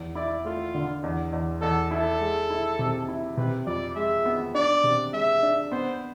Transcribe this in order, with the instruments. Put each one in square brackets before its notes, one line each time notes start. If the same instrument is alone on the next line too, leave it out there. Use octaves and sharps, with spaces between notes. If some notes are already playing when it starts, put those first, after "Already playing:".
Already playing: [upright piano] E2
[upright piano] E4 [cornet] D5
[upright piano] A3 [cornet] F4
[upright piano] D3
E2
E2
[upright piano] E2 [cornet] A4
[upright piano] E4 [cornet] A4
[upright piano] G#3
E4
C3
E4
[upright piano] C3 [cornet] B4
[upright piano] F2 [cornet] D5
[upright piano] G#3 [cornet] E5
[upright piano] B3
[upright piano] D4 [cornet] D5
[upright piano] C3
[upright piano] G#3 [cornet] E5
[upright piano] D4
[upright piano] B3 [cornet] C5